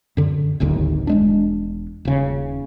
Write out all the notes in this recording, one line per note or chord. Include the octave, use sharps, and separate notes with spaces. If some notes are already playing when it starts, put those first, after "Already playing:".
F#2 D3
D1 G1 D#2 D3
E1 G#3 D4
D#1 C#3